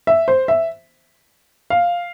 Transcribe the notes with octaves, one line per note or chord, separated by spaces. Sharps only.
E5
C5
E5
F5